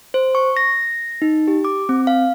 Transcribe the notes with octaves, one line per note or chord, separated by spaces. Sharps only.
C5
C#6
A#6
D#4
G4
D6
C4
F5